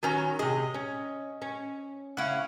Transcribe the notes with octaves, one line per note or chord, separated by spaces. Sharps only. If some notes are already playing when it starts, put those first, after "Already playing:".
D#3 F#3 B3 C#4 A#5
C3 G#4 D#5
C#4
C#4
C#3 C#4 E4 F5 F#5